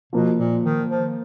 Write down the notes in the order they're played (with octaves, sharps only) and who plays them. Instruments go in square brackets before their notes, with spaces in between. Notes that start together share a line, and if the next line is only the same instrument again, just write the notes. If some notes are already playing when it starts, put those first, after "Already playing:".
[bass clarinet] B2 [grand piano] F3 A#3 F4
[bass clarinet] A#2
D#3
F3